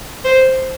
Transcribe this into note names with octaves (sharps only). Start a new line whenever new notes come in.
C5